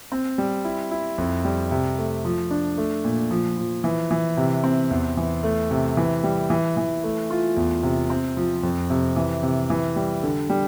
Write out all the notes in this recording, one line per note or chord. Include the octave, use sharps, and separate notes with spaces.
C4
G3
E4
E4
F2
G3
C3
A3
F3
D4
A3
A#2
F3
F3
E3
E3
C3
C4
E2
E3
A3
C3
E3
G3
E3
E3
A3
F4
E2
C3
C4
F3
F2
C3
E3
C3
E3
G3
D3
G3